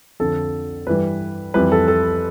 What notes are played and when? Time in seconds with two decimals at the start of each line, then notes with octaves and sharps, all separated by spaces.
0.20 F2 D3 F3 A4
0.87 G2 E3 G3 B4
1.54 F2 E3 G3 B4
1.72 A4
1.88 A4